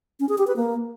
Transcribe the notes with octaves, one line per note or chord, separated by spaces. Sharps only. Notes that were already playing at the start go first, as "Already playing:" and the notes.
C#4
G#4
G4
B4
A#3